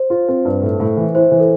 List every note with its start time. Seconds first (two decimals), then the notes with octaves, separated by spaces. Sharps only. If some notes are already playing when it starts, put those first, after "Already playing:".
Already playing: C5
0.10 F4
0.28 C4
0.45 G2
0.62 A2
0.80 A2
0.97 E3
1.15 E4 C5
1.32 E3
1.40 A4